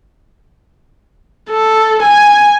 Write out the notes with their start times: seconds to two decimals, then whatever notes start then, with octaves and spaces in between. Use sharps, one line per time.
1.50 A4
2.03 G#5